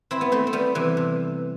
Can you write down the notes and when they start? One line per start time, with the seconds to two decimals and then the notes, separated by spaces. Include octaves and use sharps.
0.11 C4 E4
0.21 B3
0.32 A3 C4
0.47 C4
0.53 G3 B3
0.75 C3 E3
0.97 C3